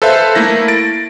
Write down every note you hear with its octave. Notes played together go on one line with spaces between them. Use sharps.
A4 B4 C5 E5 F5
A3 A#3 E4 A#6
A6 D7